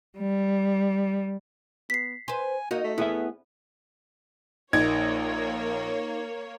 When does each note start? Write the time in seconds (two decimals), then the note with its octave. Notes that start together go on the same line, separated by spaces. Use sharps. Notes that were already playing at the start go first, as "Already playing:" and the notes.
0.18 G3
1.90 B3 B6 C7
2.28 B4 C5 G#5
2.71 A#3 D#4 F#4
2.84 A3
2.98 B3 E4 G#4 E5
4.73 A#1 A#3 D#4 C#5 G#6